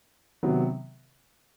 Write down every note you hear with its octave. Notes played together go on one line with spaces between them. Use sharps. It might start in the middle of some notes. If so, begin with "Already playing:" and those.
C3 D#3 F#3 B3